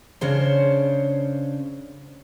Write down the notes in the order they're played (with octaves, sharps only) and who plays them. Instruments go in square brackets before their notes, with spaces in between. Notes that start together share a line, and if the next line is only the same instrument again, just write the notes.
[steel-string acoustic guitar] C#3 C#4 D4 C5 C#5